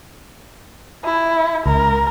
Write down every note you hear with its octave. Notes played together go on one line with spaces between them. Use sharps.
E4
C#2 A#4